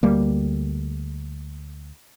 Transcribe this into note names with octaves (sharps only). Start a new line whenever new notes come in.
D2 G3 A#3